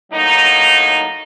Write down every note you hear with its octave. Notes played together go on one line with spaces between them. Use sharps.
A2 F#3 A#3 D#4